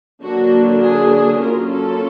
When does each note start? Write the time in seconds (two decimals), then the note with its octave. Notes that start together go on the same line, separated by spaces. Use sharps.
0.23 D3 F#3 A#3 D4 F#4
0.82 G#4
1.40 F#3 A#3 C#4 F4 A#4
1.70 A4